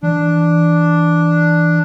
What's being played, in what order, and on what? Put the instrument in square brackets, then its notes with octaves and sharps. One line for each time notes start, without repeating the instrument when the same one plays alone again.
[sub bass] E3 [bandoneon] D4